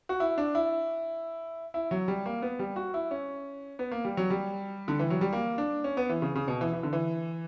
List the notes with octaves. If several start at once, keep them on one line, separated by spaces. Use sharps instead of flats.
F#4
E4
D4
E4
E4
F#3
G3
A#3
B3
G3
F#4
E4
C#4
B3
A#3
G3
F#3
G3
D3
E3
F#3
G3
A#3
D4
C#4
B3
E3
C#3
C#3
B2
E3
E3
D3
E3